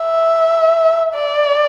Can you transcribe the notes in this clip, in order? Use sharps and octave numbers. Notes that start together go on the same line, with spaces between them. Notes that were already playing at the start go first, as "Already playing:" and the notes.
Already playing: E5
D5